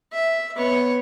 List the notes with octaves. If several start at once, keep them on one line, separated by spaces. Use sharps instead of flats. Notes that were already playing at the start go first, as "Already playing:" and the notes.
E5
B3 C#5